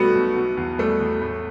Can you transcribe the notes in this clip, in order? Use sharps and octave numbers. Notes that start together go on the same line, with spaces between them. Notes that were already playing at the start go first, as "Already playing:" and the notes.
Already playing: B1 B2 G3 A3 B3 F#4
B1
B2
E2
G3 A3
E2
A2